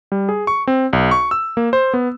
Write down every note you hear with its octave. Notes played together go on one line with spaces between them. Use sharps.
G3
G#4
C#6
C4
B1
C#6
E6
A#3
C5
B3